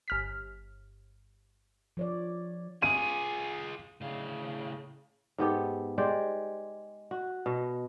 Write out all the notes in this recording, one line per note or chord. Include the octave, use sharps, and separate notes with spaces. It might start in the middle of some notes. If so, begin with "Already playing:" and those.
G1 F6 B6
F3 C#5 D5
F4 G#4 D#7
A2 C#3 F5
G#2 B3 G4 A4
G#3 G4 C5 D5
F#4
B2 D#5